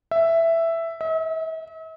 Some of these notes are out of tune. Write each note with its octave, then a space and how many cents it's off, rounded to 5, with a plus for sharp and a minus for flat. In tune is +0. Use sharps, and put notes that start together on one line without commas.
E5 +5
E5 -45